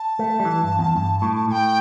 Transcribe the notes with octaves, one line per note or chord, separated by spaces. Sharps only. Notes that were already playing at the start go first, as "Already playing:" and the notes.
Already playing: A5
A3
G3
E3
G2
E2
G2
A2
A2 G5 A5